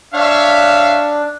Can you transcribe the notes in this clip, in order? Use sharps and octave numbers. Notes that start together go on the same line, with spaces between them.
D4 C#5 E5 F5